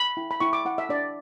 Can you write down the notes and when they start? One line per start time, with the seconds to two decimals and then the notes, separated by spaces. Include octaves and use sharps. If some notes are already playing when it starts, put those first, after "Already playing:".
Already playing: B5
0.17 E4
0.31 B5
0.40 E4 C#6
0.53 D6
0.65 E4 F#5
0.78 E5
0.89 D4 D5